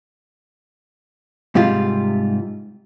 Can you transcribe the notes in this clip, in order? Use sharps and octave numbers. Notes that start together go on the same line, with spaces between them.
G#2 C3 G3 F4